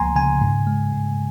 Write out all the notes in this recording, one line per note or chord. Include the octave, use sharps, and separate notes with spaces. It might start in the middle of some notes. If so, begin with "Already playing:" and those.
Already playing: C#2 F3 A#3 G#5 A#5 C6
C#3 G#5
G#2
G#3
G#2